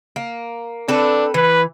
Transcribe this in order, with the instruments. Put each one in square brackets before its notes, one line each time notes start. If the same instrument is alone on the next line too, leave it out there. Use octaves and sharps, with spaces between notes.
[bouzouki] A#3
[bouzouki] C4 A4 B4 [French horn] D4
[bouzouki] E3 [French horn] B4